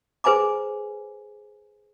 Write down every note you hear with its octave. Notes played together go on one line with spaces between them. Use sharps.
G#4 B4 C5 G#5 A#5 D6